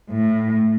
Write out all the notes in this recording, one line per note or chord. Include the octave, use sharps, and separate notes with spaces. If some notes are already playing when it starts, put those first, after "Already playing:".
A2